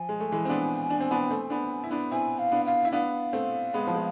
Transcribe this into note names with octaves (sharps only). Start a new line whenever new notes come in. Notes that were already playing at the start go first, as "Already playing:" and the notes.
Already playing: F3 G#5
G#3
A3
E3 G#3
C4
B3 D4
D4
C4
B3 D4
A3 C4
B3 D4
E4
B3 D4
C4 E4 G#5
F5
B3 D4
F5
E4
B3 D4 F5
A3 C4
G#3 B3
F3
G#3